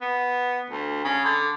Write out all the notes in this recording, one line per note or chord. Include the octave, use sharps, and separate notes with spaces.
B3
D2
C#3
D3